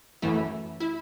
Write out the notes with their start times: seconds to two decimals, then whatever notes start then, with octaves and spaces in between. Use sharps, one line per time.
0.22 F#2 E3 A3 E4
0.80 E4